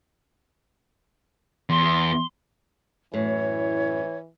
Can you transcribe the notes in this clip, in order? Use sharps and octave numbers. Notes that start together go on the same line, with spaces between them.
E2 C6
F#2 A2 E3 C#5